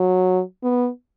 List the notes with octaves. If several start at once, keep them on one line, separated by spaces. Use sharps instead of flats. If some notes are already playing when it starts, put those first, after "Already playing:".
Already playing: F#3
B3